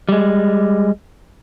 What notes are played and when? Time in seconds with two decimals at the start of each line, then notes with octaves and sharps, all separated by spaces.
0.09 G3 G#3